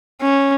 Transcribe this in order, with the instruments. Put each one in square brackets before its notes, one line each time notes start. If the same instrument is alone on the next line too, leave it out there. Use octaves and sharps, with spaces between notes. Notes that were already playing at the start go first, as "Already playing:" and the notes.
[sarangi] C#4